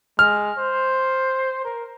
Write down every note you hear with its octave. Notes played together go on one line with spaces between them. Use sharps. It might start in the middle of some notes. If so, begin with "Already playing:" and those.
G#3 F6
C5
A#4